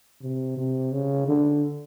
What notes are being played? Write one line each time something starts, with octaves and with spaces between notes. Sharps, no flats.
C3
C3
C#3
D3